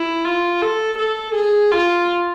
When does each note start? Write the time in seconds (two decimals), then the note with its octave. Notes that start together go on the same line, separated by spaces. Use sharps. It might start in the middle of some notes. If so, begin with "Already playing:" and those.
Already playing: E4
0.25 F4
0.62 A4
0.99 A4
1.35 G#4
1.72 F4